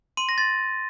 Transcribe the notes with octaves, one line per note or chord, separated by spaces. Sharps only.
C6 D#7
A#6
C6 A6